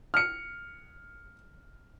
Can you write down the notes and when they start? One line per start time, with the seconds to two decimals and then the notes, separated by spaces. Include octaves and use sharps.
0.14 F6 C#7